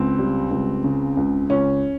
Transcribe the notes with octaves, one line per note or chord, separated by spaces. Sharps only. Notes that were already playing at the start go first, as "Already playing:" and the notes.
Already playing: C#2 C4
G3
C#2
C#3
C#2
C#2 C#4